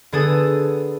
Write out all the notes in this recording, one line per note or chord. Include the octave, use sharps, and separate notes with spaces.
D3 B3 G#4 A4 D#6